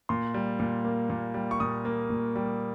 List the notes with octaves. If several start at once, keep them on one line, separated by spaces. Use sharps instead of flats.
A#2 C6
G3
A#2
A#3
A#2
G3
C#6
A#2 D#6
A#3
A#2
G3